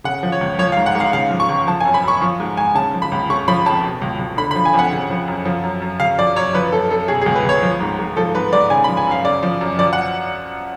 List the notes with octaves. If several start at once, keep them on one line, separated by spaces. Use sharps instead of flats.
C#3 F#5
F3
C#5
C#2
F3 C#5
F5
G#2
F#5
G#2
F5
C#3 F5
F3
C#6
C#2
F3 A5
G#5
F#2
B5
F#2 C#6
F3
G#2
G#2 G#5
C#3 A5
F3
B5
C#2
C#3 C#6
F3 B5
F2 A5
B2
C#2
C#2
D3 B5
B5
F3
G#5
F2 F#5
C#3
F3
F#2
F3
F#2
F#2
C#3 F5
F3 D5
F#2 C#5
F3 B4
F#2 A4
F#2 A4
B2 G#4
G#4
C#2
B4
C#2 C#5
F3
G#2
G#2
F3 A4
G#2 B4
G#2 D5
C#3 G#5
B5
F3
G#5
F#2 F5
C#3 D5
F3
F#2
F3 D5
F#5